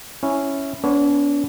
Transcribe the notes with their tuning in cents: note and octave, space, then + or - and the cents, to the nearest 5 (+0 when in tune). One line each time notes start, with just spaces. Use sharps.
C#4 +0 E4 +0
B3 +0 D4 -40 C#5 -20